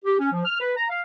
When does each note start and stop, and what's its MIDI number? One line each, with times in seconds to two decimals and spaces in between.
0.05 0.16 67
0.19 0.29 61
0.33 0.44 53
0.45 0.57 89
0.60 0.71 71
0.76 0.85 82
0.90 1.01 77